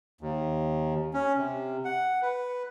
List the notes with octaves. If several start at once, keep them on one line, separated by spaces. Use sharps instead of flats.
D#2
C#4
C3
F#5
B4